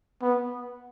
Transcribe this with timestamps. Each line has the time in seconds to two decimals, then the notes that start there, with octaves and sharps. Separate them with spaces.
0.22 B3